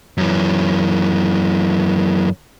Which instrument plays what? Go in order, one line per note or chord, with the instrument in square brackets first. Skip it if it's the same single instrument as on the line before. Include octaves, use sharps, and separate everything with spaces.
[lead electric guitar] F#2 E3